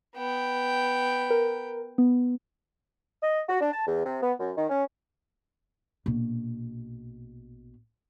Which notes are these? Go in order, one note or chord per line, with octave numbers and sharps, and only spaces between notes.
B3 G5
A#4
B3
D#5
F#4
D4
A5
E2
C3
B3
F#2
D#3
C#4
A#1 B2